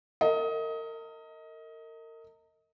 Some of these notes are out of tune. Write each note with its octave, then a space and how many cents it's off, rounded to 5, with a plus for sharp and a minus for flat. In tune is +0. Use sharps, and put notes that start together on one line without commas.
A#4 -35 D#5 +25